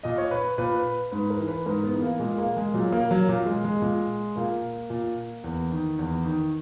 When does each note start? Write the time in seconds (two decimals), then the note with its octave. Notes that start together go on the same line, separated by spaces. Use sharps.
0.03 A#2 D#5
0.18 C#5
0.31 B4
0.58 A#2 B4
0.76 B4
1.12 G#2 B4
1.30 A#4
1.39 E3
1.48 B4
1.66 G#2 A#4
1.84 B3
1.93 E3
2.02 A#3
2.19 A#2 G#3
2.38 A#3
2.56 G#3
2.74 A#2 F#3
2.93 A#3
3.11 F#3
3.29 A#2 A#3
3.46 G#3
3.64 G#3
3.82 A#2 G#3
4.36 A#2 A#3
4.90 A#2
5.44 E2
5.72 D#3
5.99 E2
6.25 D#3